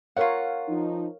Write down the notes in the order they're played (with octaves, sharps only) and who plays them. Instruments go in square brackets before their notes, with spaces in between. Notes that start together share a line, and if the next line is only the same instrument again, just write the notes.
[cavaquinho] F4 F#5 [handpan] A#4 C#5 F5
[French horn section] F3 D#4